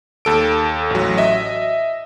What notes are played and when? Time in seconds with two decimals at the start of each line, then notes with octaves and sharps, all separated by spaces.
0.25 D#2 A4 D7
0.90 A1 F#3
1.17 D#5 E5